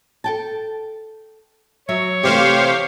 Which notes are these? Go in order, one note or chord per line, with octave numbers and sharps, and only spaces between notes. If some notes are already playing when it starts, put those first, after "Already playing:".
A4 G5 A5
F#3 C#5 E5
C3 E3 A3 G4 C5 F5